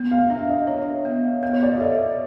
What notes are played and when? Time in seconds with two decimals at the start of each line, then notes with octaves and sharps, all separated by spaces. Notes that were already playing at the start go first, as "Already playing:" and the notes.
Already playing: B3
0.11 F5
0.30 D4 E5
0.49 D#5
0.67 D4 C#5
1.05 B3
1.43 B3 F5
1.53 C#5
1.63 D5
1.72 D#5
1.79 A4 E5